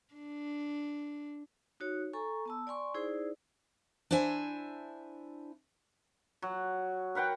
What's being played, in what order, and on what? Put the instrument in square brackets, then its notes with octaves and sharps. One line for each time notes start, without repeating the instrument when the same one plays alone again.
[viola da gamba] D4
[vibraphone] D#4 F#4 C#5
A4 G#5 A#5 C#6
B3 A5 E6
D5 G#5 C6 C#6
D#4 E4 G#4 C5 D5
[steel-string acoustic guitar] D4 E4 C5 E5 G#5
[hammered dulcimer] F#3
A#4 B4 F#5 G5